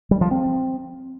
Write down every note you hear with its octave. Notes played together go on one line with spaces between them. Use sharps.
G3
F3
C4